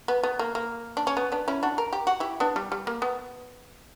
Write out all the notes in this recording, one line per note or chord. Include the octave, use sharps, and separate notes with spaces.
B3
B3
A#3
A#3
D4
C#4
B3
B3 D4
C#4 E4
D4 F#4
A#4
G4
F#4
E4 G4
B3 D4
G3
G3
A#3
B3